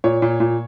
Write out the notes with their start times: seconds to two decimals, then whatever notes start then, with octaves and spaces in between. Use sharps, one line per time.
0.04 A#2 C#5
0.22 A#2
0.40 A#2